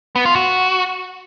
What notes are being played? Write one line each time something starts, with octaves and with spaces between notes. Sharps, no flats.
B3
F4
F#4